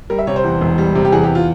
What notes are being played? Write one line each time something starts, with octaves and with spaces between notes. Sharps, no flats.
G3 A#4
E5
C3 C#5
C5
E2
E1
G3
C3
G4
E2 G#4
G4
F4